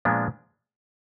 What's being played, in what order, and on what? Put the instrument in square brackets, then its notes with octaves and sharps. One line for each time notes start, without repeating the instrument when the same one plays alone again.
[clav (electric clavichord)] A#2 F3 G#3 B3 D4